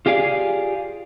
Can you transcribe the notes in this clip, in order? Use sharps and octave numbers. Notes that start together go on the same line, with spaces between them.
F4 G4 G#4 D5 F5